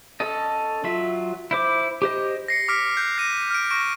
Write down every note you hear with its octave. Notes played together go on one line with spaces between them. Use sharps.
C#4 A4 D#5
F#3 F4 E5
E4 C5 D6
G4 C5 D#5
A#6 C7 C#7
D6 F6 B6 D7
F#6 G6
F6 A#6 C7 D#7
F6 D7
C#6 A#6 D7